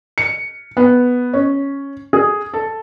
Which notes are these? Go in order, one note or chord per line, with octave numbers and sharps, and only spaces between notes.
C#7
B3
C#4
G#4
A4